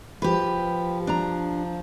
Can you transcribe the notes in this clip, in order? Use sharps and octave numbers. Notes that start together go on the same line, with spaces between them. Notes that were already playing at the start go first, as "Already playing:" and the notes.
F3 G4 B4
D4 A#5